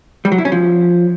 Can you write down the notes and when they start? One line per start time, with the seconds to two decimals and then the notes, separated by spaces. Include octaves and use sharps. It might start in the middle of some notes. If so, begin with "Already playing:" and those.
0.25 G3
0.32 F#3
0.38 E4
0.45 C#4
0.52 F3